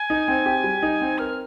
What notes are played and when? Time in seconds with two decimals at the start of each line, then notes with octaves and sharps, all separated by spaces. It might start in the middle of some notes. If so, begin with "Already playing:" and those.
Already playing: G#5
0.10 D#4
0.28 C4
0.46 G4
0.64 G3
0.83 D#4
1.01 C4
1.18 A#4 F6